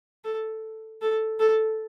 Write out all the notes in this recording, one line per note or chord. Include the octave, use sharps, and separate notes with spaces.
A4
A4
A4